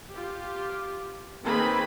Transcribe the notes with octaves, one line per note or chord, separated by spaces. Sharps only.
F4 G4
D#3 A#3 C4 G#4 B4 B5